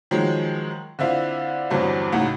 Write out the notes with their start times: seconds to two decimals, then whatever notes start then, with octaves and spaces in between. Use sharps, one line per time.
0.11 D#3 F3 F#3 G#3
0.99 D3 C4 E4 F4
1.70 E2 G2 D3 E3 F#3 C4
2.12 C#2 A2 D#4 F#4 F#5